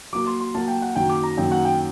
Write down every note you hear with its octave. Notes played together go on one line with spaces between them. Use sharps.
F#3 A#3 F#4 D6
C6
C6
F#3 A#3 F#4 A5
G5
F#5
F#2 D#3 F#3 A#3 G5
D6
A#5
F#2 D#3 F#3 A#3 G5
F#5
G5